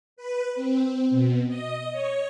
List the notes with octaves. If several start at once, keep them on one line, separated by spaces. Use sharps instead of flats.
B4
C4
B2
D#5
C#5